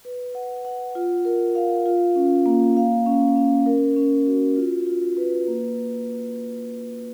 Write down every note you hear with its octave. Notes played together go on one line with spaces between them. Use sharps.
B4
F#5
F#5
F4
A#4
F5
F4
C#4
A#3
F5
C#4
C#4
A#4
C#4
F#4
F4
F4
B4
A#3